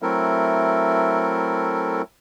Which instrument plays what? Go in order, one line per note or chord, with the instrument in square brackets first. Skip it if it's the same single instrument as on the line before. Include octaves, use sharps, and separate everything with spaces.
[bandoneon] F#3 A3 C4 E4 A4 A#4